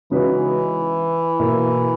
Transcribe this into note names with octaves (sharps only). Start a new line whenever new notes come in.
C#3 E3 G#3 D#4 F#4 B4
B2 A#3 E4